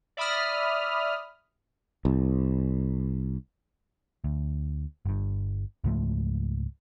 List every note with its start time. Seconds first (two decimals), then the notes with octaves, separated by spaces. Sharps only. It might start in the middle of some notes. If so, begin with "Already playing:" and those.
0.17 D5 E5 B5 D#6 F6
2.05 C2
4.24 D2
5.06 G1 G2
5.84 C#2 G#2 F3 A3